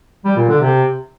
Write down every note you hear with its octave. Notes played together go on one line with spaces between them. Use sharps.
G3
A#2
D3
C3